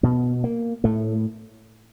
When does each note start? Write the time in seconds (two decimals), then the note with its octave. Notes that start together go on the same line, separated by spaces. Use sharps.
0.03 B2 B3
0.44 A#3
0.84 A2 A3